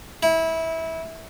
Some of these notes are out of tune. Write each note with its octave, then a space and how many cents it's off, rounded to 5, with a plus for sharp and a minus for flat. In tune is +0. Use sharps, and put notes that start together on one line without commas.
E4 -20